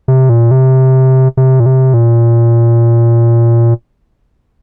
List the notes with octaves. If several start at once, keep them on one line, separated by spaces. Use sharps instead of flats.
C3
A#2
C3
C3
A#2
C3
A#2